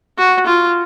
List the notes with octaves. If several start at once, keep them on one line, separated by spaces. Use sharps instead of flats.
F#4
F4